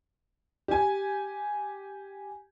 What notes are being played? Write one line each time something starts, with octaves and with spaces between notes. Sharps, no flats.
G4 G#5